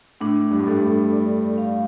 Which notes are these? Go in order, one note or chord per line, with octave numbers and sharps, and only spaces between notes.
A2 D4
G2
A2
G2 A4
A2
D5
F5